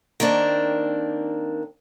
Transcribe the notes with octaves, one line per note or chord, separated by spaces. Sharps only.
D#3 A#3 C4 D4